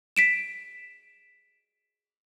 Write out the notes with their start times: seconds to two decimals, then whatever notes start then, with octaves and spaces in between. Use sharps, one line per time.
0.17 B6 D7 E7